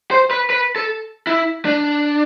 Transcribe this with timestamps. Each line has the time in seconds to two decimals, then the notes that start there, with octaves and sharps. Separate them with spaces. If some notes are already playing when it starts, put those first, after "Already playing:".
0.11 C5
0.31 B4
0.50 B4
0.76 A4
1.27 E4
1.65 D4